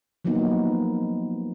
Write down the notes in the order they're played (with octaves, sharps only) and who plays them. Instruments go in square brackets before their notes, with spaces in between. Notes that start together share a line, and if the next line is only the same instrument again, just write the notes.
[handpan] F3 F#3 A#3 B3 D#4